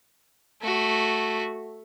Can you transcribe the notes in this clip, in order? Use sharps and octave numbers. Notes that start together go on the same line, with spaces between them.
A3 F#4